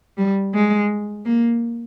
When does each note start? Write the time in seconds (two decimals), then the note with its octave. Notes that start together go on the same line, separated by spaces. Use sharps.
0.18 G3
0.54 G#3
1.26 A#3